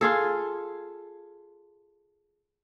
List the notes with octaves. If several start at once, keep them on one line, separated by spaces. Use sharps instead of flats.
F4 G#4 A4